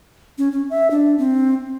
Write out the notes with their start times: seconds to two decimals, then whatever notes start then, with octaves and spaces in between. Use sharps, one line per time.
0.38 C#4
0.52 C#4
0.70 E5
0.91 D4
1.19 C4